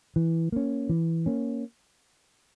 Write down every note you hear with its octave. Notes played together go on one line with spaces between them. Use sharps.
E3
A#3 C#4
E3
A#3 C#4